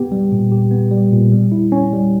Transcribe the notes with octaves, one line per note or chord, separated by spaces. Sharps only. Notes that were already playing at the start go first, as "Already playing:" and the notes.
Already playing: B3 G4
G3
A#2
G4
B3
G3
A#2
G3
E4
C#4
G3